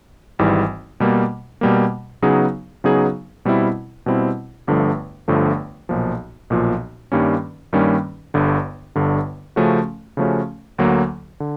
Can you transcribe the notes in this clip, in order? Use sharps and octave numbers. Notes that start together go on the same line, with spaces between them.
G#1 G#2 E3 G3
B2 G3 A#3
B2 G3 A#3
C#3 F#3 B3 D#4 G#4
C#3 F#3 B3 D#4 G#4
B2 G3 C4 E4
B2 G3 C4 E4
G1 G2 D3 F3 A3
G1 G2 D3 F3 A3
B1 A#2 F3
B1 A#2 F3
G2 D#3 G3 A#3 C#4
G2 D#3 G3 A#3 C#4
G1 G2 D3
G1 G2 D3
C#3 F3 A3 C#4 F#4
C#3 F3 A3 C#4 F#4
D2 D3 F#3 A#3
D3